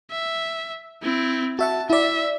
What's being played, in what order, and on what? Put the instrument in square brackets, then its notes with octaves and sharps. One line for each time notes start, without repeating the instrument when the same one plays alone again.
[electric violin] E5
C4 E4
[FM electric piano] F#4 E5 F#5 [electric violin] A5
[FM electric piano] E4 D5 [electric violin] E5